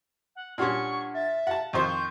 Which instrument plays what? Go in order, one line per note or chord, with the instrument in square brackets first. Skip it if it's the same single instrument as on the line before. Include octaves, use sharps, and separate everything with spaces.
[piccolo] F#5
[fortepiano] A#2 G3 C#4 [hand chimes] D4 F#5 A5 [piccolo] C#6
[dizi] E5 [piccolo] A6
[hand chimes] F5 [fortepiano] F#5 A5
[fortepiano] F2 D#3 C5 [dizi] C#6 [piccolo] G6